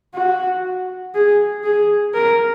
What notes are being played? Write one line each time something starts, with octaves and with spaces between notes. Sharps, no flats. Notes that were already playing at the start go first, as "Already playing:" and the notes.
F#4
G#4
G#4
A#4